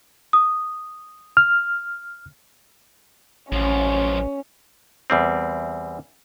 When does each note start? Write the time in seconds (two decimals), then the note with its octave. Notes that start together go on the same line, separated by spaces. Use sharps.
0.33 D#6
1.37 F6
3.52 A1 F#2 F3 C#4
5.10 E2 G3 C4